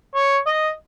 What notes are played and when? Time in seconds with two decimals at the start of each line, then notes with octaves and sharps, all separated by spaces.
0.15 C#5
0.46 D#5